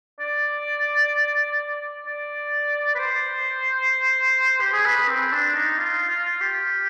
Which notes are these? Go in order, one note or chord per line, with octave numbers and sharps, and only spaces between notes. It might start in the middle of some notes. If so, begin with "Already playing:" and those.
D5
D5
B4
C5
G4
G#4
B4
C4
D4
D#4
F4
F4
G4